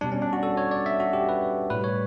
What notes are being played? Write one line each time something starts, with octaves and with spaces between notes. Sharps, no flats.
B2 G3 D4
C#4
D4
F#4
A4
C#5
D5
E5
F#4
G4
B4
A2 G3 B4
C#5